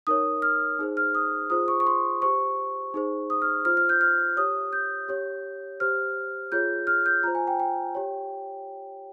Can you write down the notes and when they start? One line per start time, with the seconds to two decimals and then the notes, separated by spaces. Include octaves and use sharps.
0.07 D#4 A#4 C#5 D#6
0.42 F6
0.79 D#4 G#4 C5
0.97 F6
1.15 D#6
1.50 F4 G#4 C5 D#6
1.68 C#6
1.80 C#6
1.87 C6
2.22 G4 C5 C#6
2.94 D#4 G#4 C5
3.30 D#6
3.42 F6
3.65 F4 C5 F6
3.77 F6
3.89 G6
4.01 F6
4.37 G4 C#5 D#6
4.73 G6
5.08 G4 C#5
5.80 G4 C5 F6
6.52 F4 G#4 C#5 G6
6.87 F6
7.06 G6
7.23 F4 C5 A#5
7.35 G#5
7.47 G5
7.60 G5
7.95 G4 C#5